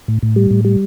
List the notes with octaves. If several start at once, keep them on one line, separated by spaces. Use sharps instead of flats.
A2
A2
G3
A2
G3